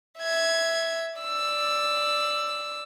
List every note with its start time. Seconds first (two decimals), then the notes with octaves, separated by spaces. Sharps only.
0.19 E5 G#6
1.19 D5 E6